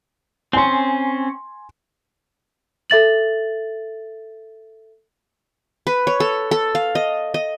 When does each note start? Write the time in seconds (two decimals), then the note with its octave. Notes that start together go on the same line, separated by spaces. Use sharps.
0.53 C4 C#4 G#5 C6
2.90 A4 E5 A6 F#7
5.87 B4
6.07 C#5
6.20 A4
6.51 A4
6.75 F5
6.95 D#5
7.34 D#5